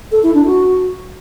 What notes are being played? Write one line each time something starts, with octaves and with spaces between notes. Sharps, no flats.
A4
E4
D4
F#4